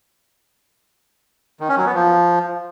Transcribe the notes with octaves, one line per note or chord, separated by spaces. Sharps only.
D#3
C#4
F#3
B3
F3